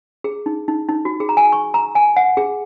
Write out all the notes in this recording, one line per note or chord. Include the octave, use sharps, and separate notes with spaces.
G#4
D#4
D#4
D#4
F#4
G#4
A#5
G#5
C#6
A#5
G#5
F#5
G#4